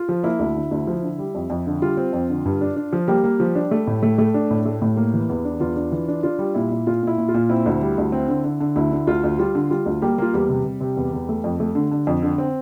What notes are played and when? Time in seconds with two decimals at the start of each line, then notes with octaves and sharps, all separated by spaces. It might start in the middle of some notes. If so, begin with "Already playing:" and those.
Already playing: F4
0.09 F3
0.23 A#3 E4
0.39 D2
0.55 D3
0.71 D2
0.87 F3
1.03 D3
1.19 G3
1.35 F2
1.50 F2
1.66 D3
1.82 G3 F4
1.97 C4
2.13 F2
2.29 D3
2.45 G2
2.61 D4
2.76 D4
2.93 F3
3.08 G3 A#3 G4
3.24 A#3
3.40 F3
3.55 D4
3.71 A3
3.87 A2
4.03 A3
4.18 A3
4.34 D4
4.50 A2
4.66 A3
4.82 A2
4.97 A#3
5.14 E3
5.29 E2
5.44 D4
5.60 E2 F4
5.76 D4
5.92 E3
6.08 D4
6.23 D4 F4
6.39 G3
6.54 A#2 E4
6.71 A#2
6.87 A#2 F4
7.03 A#2 E4
7.18 A#2
7.28 F4
7.34 A#2
7.49 C4 E4
7.66 D2
7.81 G3
7.98 D2
8.12 C4
8.28 D3
8.44 D3
8.60 D3
8.76 D2 E4
8.91 D3
9.07 D2 F4
9.24 D2
9.39 G3 F4
9.55 D3
9.70 G3 F4
9.86 D2
10.02 G3 A#3 G4
10.18 A#3 F4
10.34 E2 G3 G4
10.49 C3
10.65 C3
10.81 C3
10.97 E2
11.13 E2
11.29 A3
11.44 F2
11.60 A3
11.75 D3
11.91 D3
12.07 F2
12.22 D3
12.38 C4